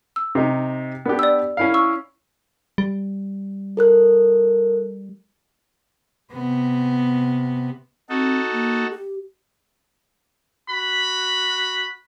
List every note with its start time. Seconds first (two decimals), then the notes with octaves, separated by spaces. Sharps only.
0.16 E6
0.35 C3 D#4
1.05 B3 D4 G4
1.19 D5 E6
1.57 C#4 E4 F5
1.74 C#6 E6
2.78 G3
3.77 A4 A#4 F#6
6.32 C3 B3
8.09 C4 D#4 F#4 A4
8.53 A#3
8.91 G4
10.69 F#4 B5